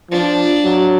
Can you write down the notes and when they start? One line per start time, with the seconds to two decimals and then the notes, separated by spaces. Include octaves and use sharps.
0.11 F3 D4
0.64 F#3